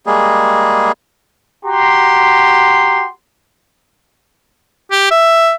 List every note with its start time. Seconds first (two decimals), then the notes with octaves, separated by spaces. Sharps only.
0.06 G3 G#3 A#3 G#4
1.64 F#4 G4 A#5 C6
4.91 G4
5.11 E5